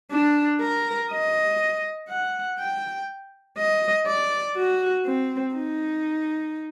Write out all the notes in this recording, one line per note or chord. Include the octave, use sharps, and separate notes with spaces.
D4
A#4
D#5
F#5
G5
D#5
D5
F#4
C4
D#4